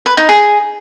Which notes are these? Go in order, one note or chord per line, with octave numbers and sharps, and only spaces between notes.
B4
D#4
G#4